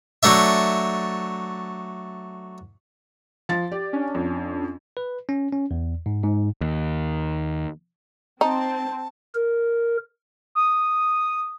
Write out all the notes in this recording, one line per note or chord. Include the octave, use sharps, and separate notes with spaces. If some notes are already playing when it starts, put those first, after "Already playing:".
F#3 A3 D4 E5
F3 A6
G4 D5
C#4 D4
F2
B4
C#4
C#4
E2
G#2
G#2
D#2
C4 D#4 A5
A#4
D#6